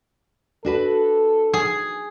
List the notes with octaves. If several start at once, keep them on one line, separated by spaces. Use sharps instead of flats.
D4 F#4 A4 B4
G#4